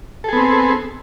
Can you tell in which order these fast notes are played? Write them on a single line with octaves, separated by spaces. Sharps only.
A4 G#4 B3 C4